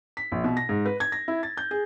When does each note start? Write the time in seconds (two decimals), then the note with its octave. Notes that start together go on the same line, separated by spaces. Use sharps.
0.17 B6
0.32 A#1
0.44 B2
0.57 A#6
0.69 G#2
0.86 B4
1.00 G#6
1.12 A#6
1.28 E4
1.43 A6
1.57 G6
1.71 G#4